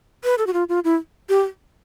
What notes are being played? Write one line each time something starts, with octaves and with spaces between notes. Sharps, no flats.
B4
A4
F#4
F4
F4
E4
G4